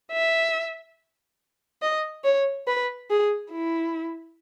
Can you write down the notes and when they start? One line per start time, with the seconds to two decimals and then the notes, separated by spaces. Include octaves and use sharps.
0.12 E5
1.82 D#5
2.24 C#5
2.67 B4
3.10 G#4
3.52 E4